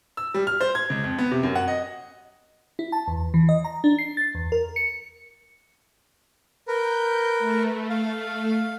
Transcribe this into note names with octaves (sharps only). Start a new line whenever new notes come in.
E6
G3
F6
C5
G#6
C#2
F2
B3
C3
F#2
F#5
D#5
E4
A5
E2
E3
D#5
A#5
D4
C7
A6
E2
A#4
C#7
A#4 B4 G6
A3
F5